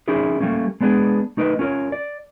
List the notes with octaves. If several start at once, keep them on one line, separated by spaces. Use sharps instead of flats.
C#4 D#4 E4 G#4 A#4
G3 A3 A#3 C#4
G#3 B3 D4 G#4
A3 D#4 A#4 B4 D#5
C#4 F4 A#4 C#5
D5